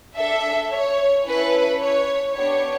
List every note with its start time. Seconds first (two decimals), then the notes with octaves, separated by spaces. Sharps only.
0.16 D4 A4 E5
0.71 C#5
1.26 C#4 E4 A4 B4
1.81 C#5
2.36 B3 D4 G4 C#5